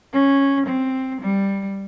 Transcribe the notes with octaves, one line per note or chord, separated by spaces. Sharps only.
C#4
C4
G3